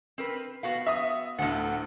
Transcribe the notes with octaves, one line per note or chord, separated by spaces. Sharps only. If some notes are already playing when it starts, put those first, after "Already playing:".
C4 A#4 B4
B3 F#4 F5
E5 D#6
D2 A2 F#5